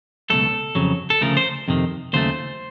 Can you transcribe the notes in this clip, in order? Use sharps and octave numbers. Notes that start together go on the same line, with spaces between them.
C#2 B2 F#3 A3 A4
F2 C#3 F#3
A4
D2 C#3 F3 A3 A#4
C5
F2 C3 D#3
D#2 C#3 F#3 A3 C5